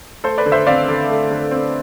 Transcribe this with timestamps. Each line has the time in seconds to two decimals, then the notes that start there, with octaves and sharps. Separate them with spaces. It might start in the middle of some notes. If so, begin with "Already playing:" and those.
0.24 A3 A4 C5
0.38 B4 D5
0.46 D3
0.52 C5 E5
0.67 C4 D5 F5
0.88 D3
1.09 A3
1.31 D3
1.51 C4